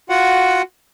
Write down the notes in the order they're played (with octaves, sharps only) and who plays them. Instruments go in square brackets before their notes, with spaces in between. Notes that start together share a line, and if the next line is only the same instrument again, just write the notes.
[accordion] F4 F#4 F#5